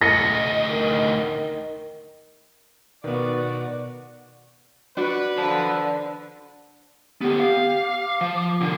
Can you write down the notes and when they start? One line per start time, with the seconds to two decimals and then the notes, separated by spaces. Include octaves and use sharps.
0.01 D2 D#5 A#6 C#7
0.70 D#3
3.04 B2 D#3 B3 F#4 B4 D5
4.97 D4 F#4 B4 D5
5.38 D3 C5 A5
7.21 D3 B3 G4
7.40 F5
7.81 D6
8.21 F3
8.61 C2 D3